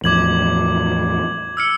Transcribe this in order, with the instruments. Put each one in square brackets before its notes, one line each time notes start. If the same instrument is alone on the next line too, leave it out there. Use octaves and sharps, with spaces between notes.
[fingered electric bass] E2 A2 F3 [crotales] D6 G#6 F#7
[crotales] E6 F6 C#7